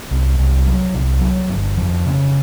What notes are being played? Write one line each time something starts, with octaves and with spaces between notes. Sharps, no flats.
C2
C2
F#3
C2
F#3
G1
F2
C#3